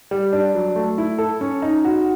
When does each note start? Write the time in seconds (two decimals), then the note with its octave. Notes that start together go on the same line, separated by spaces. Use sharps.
0.11 G3
0.33 D4
0.55 F#3
0.76 A3
0.98 E4
1.18 A4
1.41 C#4
1.62 D#4
1.85 F#4